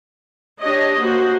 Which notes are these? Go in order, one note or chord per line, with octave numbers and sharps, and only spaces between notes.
D4 G4 C#5 D#5
A#3 F#4 C5